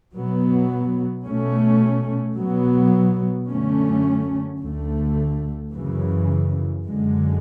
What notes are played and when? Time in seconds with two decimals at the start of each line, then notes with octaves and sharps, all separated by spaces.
0.14 B2 F#3 B3
1.25 B2 A3 C#4
2.38 B2 F#3 B3
3.49 F#2 D3 A3 C#4
4.61 D2 D3 A3
5.72 F#2 C#3 E3
6.85 F#2 D3 G#3